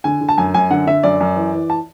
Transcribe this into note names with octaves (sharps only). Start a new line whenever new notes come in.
D3 G#5
D3
A5
F#2 G#5
F#2 G#5
D3 F#5
D3 E5
F#2 D5
F#2
E3
E3
A5